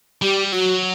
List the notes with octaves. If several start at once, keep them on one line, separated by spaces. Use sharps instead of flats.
G3 G4
F#3 F#4